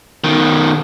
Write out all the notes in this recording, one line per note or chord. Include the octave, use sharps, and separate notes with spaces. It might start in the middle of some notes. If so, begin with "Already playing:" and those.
B2 D#3